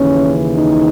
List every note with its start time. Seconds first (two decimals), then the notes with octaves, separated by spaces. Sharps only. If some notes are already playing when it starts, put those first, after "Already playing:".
Already playing: D#2 C#3 E3 C#4
0.56 D#4